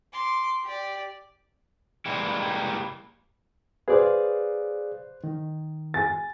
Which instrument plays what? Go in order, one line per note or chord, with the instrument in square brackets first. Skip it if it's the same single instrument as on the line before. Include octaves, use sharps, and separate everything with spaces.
[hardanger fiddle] C6 D6
G4 D5
[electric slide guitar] G3 G#3 A#3 E4 G4
[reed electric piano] G#4 D5 F5 [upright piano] B4 C5
[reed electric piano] D#3
[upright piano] G#5 A6